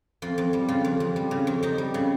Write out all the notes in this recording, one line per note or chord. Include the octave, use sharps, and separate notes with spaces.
F2 F4
F2
G3
C#3 F4
F2
F2
G3
C#3
F2
F2 D#4
G3
C#3